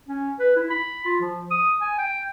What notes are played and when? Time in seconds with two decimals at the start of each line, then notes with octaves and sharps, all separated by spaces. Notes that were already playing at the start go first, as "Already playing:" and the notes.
0.09 C#4
0.40 B4
0.56 E4
0.70 B5
1.05 F4
1.21 F3
1.51 D#6
1.81 G#5
1.98 G5